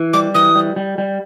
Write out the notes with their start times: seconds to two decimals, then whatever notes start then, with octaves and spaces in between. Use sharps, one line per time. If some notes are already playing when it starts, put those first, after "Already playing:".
Already playing: E3
0.13 G3 D6
0.34 E3 D#6
0.55 G3
0.76 G3
0.98 G3